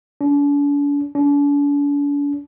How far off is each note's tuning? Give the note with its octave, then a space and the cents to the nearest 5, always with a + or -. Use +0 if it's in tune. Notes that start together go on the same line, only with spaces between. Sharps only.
D4 -45
D4 -45